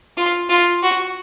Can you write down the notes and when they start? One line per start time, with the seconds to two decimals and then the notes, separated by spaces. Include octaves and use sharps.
0.17 F4
0.50 F4
0.83 F#4